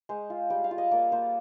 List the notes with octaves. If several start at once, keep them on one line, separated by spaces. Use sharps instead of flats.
G#3 C5
F4
G3 G5
F5
F4
D#5
A#3 D5
A#3 C5